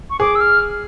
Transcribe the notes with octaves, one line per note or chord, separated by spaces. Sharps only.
C#6
G#4 D6
E6
F6